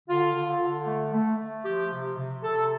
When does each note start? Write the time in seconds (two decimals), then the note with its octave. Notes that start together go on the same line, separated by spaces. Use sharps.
0.09 D3 F4
0.35 D3
0.61 D3
0.87 A3
1.13 A3
1.39 A3
1.65 F3 G4
1.92 C3
2.18 C3
2.43 C3 A4